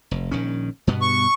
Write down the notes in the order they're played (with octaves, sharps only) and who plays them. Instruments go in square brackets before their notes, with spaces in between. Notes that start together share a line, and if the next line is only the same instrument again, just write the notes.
[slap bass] F1
A#1 D#3 C#4
G2 B2 B3
[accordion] C#6